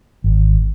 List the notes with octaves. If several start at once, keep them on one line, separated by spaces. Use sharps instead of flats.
G#1